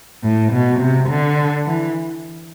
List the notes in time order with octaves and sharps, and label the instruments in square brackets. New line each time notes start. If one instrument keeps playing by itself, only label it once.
[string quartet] A2
B2
C3
D3
E3